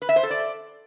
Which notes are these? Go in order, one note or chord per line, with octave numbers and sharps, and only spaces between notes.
B4
E5
C5
A4
D5